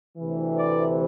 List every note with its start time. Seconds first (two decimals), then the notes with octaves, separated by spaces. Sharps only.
0.17 D2 C3 E3
0.57 D5